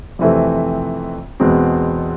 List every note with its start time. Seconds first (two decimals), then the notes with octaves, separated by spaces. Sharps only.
0.19 F2 C3 E3 A3 C4
1.40 E2 B2 G#3 C4